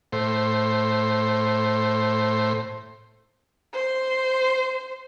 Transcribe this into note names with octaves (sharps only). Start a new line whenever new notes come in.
A2 C5
C5